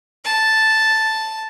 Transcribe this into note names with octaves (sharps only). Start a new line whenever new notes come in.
A5